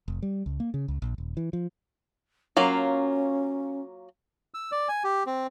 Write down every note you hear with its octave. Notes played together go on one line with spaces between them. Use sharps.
F1
G3
C#2
A#3
C#3
C#2
A#1
D#1
E3
F3
F#3 A#3 C#4 F4
E6
D5
G#5
G4
C4